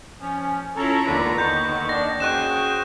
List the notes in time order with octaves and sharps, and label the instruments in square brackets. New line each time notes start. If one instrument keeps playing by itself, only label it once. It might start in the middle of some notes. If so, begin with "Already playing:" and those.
[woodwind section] F3 C#4
[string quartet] C#4 E4 [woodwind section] F4 C#5 A#5 [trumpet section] A4
[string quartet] D#2 D3 [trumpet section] B3 D4 B4
[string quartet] D#2 D#3 [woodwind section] D3 C#6 [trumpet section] B3 [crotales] G6
[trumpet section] D4 [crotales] A#6
[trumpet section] C#4 F#4 C5 [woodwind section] G#4 G5 [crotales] C#6 F#6 E7